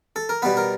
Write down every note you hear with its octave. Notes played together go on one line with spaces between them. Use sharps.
A4
A#4
B2 G3 B3 B4
A#4